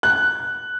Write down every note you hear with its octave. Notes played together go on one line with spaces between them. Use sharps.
F#6